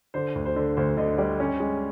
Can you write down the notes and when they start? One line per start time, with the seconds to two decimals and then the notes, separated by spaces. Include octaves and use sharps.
0.14 D3 C5
0.35 D2
0.46 C5
0.56 D3
0.77 D2 C5
0.97 D3 D#5
1.18 G3 D5
1.40 C#4
1.60 G#3